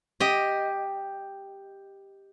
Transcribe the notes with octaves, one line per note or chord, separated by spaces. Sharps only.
G4 D#5